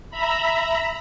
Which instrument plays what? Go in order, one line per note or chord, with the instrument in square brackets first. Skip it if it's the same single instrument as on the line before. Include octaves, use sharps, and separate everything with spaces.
[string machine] E5 A#5 B5